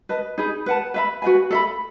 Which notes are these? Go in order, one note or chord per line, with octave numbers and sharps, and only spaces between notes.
B4 D#5 A5
D#4 G#4 B4
B4 F#5 A5
B4 E5 B5
F#4 B4 E5 G#5
A4 E5 B5